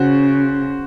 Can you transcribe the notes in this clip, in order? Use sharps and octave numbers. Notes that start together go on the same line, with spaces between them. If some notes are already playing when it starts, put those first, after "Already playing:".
Already playing: C#3 F#4 C5